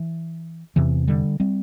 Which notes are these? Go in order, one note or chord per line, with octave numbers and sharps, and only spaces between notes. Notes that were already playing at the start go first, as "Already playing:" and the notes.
Already playing: E3
E2 C3 E3
D3 G3
G3 C4